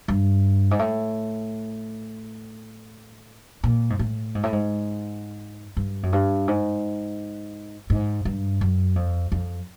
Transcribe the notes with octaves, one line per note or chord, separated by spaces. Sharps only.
G2
G#2
A2
A#2
G#2
A2
G#2
A2
G#2
G2
F#2
G2
G#2
G#2
G2
F#2
F2
F2